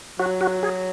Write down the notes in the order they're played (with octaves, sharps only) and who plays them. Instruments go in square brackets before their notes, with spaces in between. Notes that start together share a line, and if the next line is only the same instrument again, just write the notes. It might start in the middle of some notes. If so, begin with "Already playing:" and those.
[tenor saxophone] F#3 [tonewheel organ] F#4
[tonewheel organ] F#4
G#4